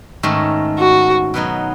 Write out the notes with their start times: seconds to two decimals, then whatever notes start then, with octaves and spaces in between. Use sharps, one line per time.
0.23 G#2 D#3 A3 C#4
0.79 F#4
1.34 B2 F#3 B3 D#4